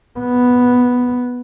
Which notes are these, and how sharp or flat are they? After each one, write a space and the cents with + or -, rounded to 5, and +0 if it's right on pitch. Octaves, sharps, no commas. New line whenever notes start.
B3 +0